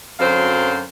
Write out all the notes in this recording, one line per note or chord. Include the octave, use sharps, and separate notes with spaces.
F#2 D3 F#3 C4 C5 F5